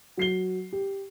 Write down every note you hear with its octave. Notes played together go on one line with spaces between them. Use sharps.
F#3 C7 G7
G4